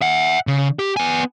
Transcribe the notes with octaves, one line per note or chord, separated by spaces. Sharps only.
E5 F#5
C#3
G4
B3 G#5